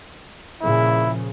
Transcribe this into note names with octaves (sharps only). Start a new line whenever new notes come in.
A#2 C#3 F3 E4